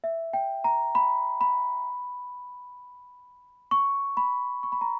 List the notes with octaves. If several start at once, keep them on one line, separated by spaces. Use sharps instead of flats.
E5
G5
A#5
B5
B5
C#6
B5
C#6
B5
A#5